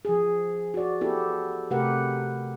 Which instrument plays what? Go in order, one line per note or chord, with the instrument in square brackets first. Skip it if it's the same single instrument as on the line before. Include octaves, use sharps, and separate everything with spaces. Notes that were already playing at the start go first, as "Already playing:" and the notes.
[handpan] F3 G#4
F#4 D5
B3 E4 G4 A4
C3 A3 G4 A#4 B4 F#5